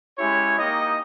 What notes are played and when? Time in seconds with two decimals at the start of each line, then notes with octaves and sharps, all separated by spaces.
0.18 G#3 C#4 E4 G4 C#5
0.58 A#3 D#4 G4 D#5